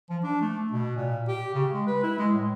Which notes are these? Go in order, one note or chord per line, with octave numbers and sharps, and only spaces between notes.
F3
D4
A3
B2
A#2
G4
C#3
G#3
B4
E4
G#3
A2